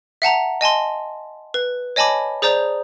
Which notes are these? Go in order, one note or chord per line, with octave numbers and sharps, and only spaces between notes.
E5 F#5 A5 A#5
D#5 G#5 A5 C6
B4
C#5 D#5 G#5 A5 B5 D6
G#4 C5 D5 A#5 D#6 G6